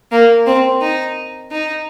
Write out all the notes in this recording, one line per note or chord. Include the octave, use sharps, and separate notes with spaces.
A#3
C4
D#4
D#4